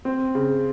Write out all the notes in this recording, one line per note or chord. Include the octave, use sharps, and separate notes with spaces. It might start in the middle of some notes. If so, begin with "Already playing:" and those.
C4
C#3